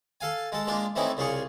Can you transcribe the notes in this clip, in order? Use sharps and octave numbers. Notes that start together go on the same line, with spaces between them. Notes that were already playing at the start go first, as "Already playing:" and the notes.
A4 F5 G#5
G#3 A4
G#3 A#3 D4 F4
E3 A3 C4 C#4 D#4 E4
C2 C#3 F4 G#4 C#6